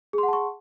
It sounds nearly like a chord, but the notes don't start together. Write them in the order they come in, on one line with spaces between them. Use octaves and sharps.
G#4 C6 F#5 A5 C#6